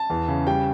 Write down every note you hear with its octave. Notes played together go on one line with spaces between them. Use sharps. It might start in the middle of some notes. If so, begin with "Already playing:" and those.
Already playing: A5
E2
C#3
G3 G5